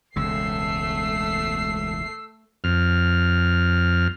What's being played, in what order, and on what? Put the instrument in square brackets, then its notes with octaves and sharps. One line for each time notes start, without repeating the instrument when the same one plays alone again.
[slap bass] E1 C#2 C#3 [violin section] A3 C7 [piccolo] E6
[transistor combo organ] F2 F6